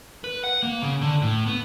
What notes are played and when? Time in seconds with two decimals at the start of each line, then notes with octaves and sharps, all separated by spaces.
0.24 B4
0.44 F#5
0.63 A#3
0.82 C#3
1.01 D3
1.22 A2
1.47 B3